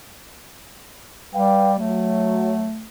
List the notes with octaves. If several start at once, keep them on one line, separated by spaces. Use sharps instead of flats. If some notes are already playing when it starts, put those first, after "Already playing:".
G3 B4 F5 G5
F#3 A3